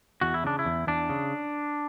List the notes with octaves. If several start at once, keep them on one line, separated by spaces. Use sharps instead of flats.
E2 F#4
E4
C#3 D4
E4
E2
E2 D4
C#3